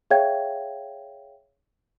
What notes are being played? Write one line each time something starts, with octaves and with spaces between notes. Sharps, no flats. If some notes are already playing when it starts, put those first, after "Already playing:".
G#4 C#5 E5 F5 G5 G#6